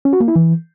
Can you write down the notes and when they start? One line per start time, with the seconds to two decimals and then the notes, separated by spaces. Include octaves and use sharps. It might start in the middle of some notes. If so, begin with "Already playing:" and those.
0.05 C#4
0.13 F#4
0.20 A#3
0.28 E4
0.36 E3